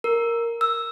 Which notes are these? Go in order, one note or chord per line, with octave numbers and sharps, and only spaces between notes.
A#4
E6